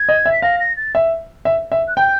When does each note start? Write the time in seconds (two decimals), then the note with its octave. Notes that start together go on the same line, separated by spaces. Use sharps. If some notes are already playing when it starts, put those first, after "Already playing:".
Already playing: G#6
0.09 D#5
0.26 E5
0.32 B6
0.42 F5 A#6
0.60 A#6
0.76 A6
0.95 E5
1.45 E5
1.72 E5
1.88 F#6
1.97 G5 G6